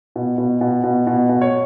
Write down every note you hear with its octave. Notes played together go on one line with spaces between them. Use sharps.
B2
B2
B2
B2
B2
B2
C#5